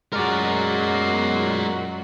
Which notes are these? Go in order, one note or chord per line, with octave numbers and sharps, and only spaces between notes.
F#2 F#3 G#3 F#4 A#4 D5